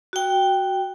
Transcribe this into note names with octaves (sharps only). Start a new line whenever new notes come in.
F#4 G5